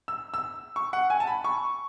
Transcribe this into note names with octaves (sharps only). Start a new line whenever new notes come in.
E6
E6
C#6
F#5
G#5
A5
B5
C#6